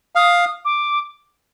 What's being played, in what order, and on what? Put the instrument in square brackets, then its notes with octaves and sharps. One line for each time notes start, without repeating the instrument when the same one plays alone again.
[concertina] F5 [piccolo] D#6
[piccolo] D6